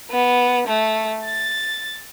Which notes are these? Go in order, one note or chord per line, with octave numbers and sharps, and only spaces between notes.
B3
A3
A6